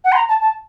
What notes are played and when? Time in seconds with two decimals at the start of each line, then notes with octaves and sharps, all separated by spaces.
0.04 F#5
0.12 C6
0.16 A#5
0.29 A5
0.41 A5